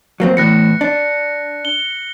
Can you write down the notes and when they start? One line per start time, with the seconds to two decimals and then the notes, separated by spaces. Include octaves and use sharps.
0.20 F#3 A#3 C4
0.37 E2 A2 F#6 A#6 C#7
0.81 D4
1.65 G7